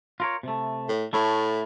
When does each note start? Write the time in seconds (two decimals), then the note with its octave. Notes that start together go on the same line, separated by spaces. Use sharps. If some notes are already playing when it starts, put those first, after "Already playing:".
0.20 F4 A#4 C#5
0.43 C3 A3
0.89 A2
1.13 A2 A3 E4